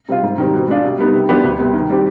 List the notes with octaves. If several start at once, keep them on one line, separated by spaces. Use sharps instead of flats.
C3 G3 C4 F4
G#2
D#3 G3 C4
B2
G#3 D4 F4
C3
G3 B3 D#4
C3
F3 B3 D4 G4
D2
C3 G3 B3
D#3
G3 C4 G4